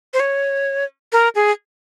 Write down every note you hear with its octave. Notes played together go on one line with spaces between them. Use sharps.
C5
C#5
A#4
G#4